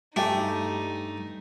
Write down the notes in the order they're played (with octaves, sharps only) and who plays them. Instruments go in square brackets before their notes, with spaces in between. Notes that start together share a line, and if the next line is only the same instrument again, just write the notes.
[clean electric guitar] G2 [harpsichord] A3 [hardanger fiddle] D#4 [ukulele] G4 G#5